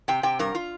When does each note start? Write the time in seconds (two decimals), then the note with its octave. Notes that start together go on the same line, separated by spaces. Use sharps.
0.08 C3 G5
0.23 C3 G5
0.39 G2 A#4
0.55 F4